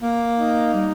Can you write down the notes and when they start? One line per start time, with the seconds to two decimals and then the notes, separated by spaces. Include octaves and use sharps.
0.01 A#3
0.37 D#4
0.73 G3